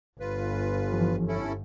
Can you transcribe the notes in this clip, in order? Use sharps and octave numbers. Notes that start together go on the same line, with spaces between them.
G1 F4 B4
E3 F3
C#4 E4 A4